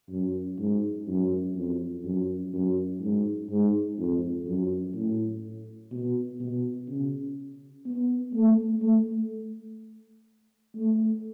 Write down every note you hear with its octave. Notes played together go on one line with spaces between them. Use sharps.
F#2
G#2
F#2
F2
F#2
F#2
G#2
G#2
F2
F#2
A2
B2
B2
C#3
B3
A3
A3
A3